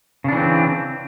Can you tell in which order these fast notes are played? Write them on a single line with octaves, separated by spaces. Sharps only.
C#3 D4 E3 C4